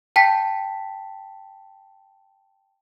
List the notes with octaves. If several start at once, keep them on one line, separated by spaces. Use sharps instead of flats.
G5 A5 B6